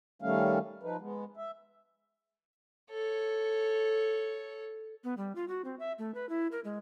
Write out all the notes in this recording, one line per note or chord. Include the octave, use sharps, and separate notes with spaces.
D#3 G3 A3 C#4 F5
F3 D#4 B4
G#3 B3
E5
A4 C#5
B3
G3
F4
F#4
C4
E5
A3
B4
E4
A#4
G#3